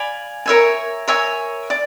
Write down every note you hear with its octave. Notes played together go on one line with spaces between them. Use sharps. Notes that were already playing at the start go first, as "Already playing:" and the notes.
Already playing: D5 F5 G#5 B5
A#4 C#5 E5 G#5
A#4 C#5 E5 G#5
D5